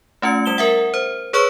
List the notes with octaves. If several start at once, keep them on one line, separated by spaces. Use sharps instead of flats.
A3 C#4 F4 C#7
G3 E7 G7
A#4 E5 F#5
C5
G#4 B4 C#5 C#6 E6 F6